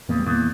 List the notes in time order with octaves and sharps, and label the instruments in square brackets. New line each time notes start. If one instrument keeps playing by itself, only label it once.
[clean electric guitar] E2 [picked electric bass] A#2 A#3
[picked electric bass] G3
[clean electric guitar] E2 [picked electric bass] A#2 A#3